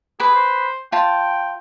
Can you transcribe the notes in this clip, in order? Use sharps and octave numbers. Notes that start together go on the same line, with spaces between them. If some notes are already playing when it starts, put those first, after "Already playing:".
G#4 B4 D6
C5
F4 G5 A5